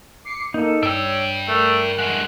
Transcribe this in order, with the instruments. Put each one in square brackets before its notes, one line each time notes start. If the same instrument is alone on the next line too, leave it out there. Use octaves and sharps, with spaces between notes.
[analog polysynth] D6 C7 C#7
[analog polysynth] A#3 [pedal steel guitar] D#4 A4
[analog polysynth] G2 [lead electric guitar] D4 G4 [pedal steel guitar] C#5 E6
[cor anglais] A3 [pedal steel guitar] A#4
[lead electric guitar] G#3 A3 [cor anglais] F#5